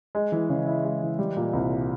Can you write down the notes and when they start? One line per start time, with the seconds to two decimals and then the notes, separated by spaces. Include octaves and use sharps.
0.15 G#3
0.32 E3
0.49 C#3
0.67 E4
0.85 G#3
1.02 E3
1.19 G3
1.36 A#2
1.53 C2